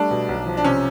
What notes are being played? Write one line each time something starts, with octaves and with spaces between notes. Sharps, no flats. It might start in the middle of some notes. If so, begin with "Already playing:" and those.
Already playing: G3 A3 D4
B2
B1
F3
D4
C3 C#4